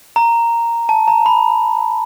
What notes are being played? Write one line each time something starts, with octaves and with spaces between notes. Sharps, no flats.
A#5
A5
A#5
B5